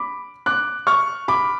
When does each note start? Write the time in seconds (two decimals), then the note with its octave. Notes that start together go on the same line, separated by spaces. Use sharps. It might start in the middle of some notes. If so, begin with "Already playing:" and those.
Already playing: B5 D6
0.46 D6 F#6
0.87 C#6 F6
1.28 B5 D6